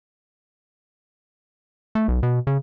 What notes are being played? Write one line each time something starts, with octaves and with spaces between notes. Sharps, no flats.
A3
B1
B2
C#3